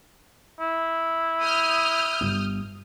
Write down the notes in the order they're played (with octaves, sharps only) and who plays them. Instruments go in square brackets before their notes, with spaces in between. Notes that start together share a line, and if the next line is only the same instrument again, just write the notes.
[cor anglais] E4
[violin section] D#6 F6 G6
[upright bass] G1